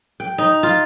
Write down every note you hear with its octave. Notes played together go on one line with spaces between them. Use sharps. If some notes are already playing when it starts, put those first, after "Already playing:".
G5
D#4
F4